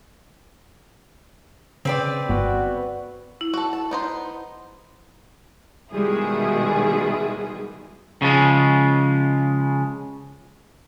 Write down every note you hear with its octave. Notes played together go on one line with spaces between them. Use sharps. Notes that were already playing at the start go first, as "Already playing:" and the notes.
C#3 C4 B4 D5 G5
G1 B3 F#4
E4
F#4 A4
A5
B3 D#4 C5
B2 D#3 G3 G#3 E4 G#4
C#3 F3 G#3